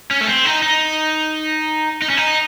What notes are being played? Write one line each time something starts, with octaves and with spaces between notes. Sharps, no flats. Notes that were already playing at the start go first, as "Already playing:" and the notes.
C#4
A3
C4
D#4
D#4
D#4
C#4
D#4